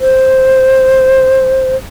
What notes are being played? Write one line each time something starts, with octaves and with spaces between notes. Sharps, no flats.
C5